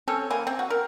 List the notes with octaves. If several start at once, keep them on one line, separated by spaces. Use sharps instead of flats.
C4 C#4 A4 C#5
E3 A#3 G#5
C4
F#4
A#4